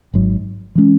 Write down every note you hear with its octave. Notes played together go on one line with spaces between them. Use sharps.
G#1 G#2 F#3
E3 G#3 C#4